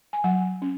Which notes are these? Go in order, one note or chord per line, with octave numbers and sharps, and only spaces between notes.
G#5
F#3 F#5
C#4